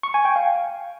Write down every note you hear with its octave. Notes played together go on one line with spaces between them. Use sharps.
C#6
G#5
G5
F5